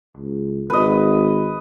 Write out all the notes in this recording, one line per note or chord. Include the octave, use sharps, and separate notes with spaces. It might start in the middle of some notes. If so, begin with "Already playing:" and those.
C#2
G#1 B4 D#5